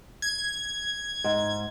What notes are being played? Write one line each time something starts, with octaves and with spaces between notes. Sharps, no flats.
G#6
G#2